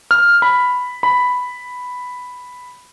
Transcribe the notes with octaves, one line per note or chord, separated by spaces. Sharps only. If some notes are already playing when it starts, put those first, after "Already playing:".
F6
B5
B5